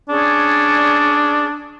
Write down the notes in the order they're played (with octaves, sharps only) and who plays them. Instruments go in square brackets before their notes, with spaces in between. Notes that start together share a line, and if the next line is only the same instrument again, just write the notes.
[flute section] C#4 G#4 D5 [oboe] D4